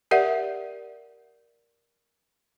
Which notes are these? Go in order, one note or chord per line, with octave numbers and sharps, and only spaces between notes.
G4 A#4 D5 E5 F#5